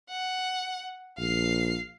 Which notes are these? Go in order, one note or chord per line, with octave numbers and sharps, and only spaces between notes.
F#5
A#1 F5 C7